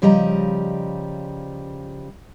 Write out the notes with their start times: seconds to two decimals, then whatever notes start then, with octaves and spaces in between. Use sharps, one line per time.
0.02 C#3 F3 G3 D#5 A#5